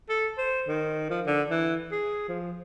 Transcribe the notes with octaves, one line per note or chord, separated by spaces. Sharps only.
A4
C5
D#3
F3
D3
E3
G#4
F3